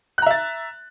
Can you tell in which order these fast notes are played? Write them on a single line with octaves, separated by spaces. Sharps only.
F#6 A#5 E5 A6